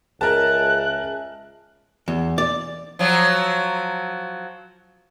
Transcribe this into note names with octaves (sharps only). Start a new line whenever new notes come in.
C#2 G#4 A#4 E5 G#5 A5 F#6
E2
D5
F3 F#3